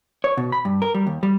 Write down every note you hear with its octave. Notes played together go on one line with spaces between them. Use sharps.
C#5
B2
B5
G2
A#4
G3
D#2
G3